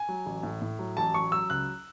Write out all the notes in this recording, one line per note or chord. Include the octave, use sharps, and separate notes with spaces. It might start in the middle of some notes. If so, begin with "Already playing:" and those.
Already playing: G#5
F#3
A1
A2
A2
F#3
A1 A5
F#3 C#6
F#3 E6
C#2 F#6